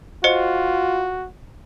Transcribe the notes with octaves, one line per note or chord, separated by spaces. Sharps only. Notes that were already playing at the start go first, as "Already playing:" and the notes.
F4 F#4 C5 D#5 C#7